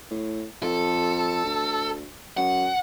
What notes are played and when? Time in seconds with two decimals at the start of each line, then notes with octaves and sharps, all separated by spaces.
0.11 A2
0.63 F2 A4
1.45 D2
2.37 F#2 F#5